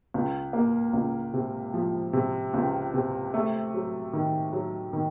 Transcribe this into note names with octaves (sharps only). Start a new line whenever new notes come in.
C#2
A#3
C#2
C3
F3
C3
C#2
C3
A3
F#3
D#3
F#3
D#3